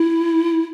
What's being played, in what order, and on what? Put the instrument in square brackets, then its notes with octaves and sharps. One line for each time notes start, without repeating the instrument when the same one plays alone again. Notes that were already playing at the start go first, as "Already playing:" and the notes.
Already playing: [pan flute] E4